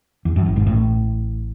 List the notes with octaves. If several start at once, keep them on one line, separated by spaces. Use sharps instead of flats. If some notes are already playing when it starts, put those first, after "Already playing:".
E2
F#2
A1 A2
G#1 G#2
A1 A2